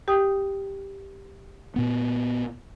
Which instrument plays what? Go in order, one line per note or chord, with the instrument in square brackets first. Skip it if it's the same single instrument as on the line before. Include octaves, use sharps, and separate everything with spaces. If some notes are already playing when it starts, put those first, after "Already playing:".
[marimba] G4 G5 D#6
[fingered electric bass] A#2 B3